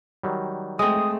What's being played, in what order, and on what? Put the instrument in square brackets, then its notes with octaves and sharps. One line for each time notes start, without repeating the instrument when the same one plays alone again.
[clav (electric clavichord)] D#3 F#3 G3
[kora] G#3 C4 [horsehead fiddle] A3 [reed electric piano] D#6